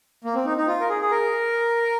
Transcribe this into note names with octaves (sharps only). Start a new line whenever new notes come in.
A#3
C4
D#4
D#4
F4
A#4
G#4
G#4
A#4